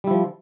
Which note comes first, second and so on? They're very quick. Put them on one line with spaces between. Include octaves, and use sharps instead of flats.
G3 E4 F3